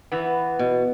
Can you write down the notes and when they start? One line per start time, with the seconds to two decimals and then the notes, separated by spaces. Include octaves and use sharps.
0.12 E3 B3
0.59 B2